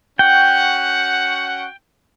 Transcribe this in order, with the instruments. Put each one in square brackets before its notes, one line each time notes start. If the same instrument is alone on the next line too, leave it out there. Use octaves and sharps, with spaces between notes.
[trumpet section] C#4 F#4 F#5 [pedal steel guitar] G5